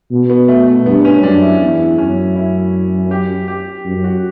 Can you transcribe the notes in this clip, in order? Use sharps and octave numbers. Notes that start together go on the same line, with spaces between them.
B2
B3
A3
A3
G2 B3
B3
C#4
F#2 D4
E4
E2 E4
F#2 C#4
E4
G4
G4
F#2
F#4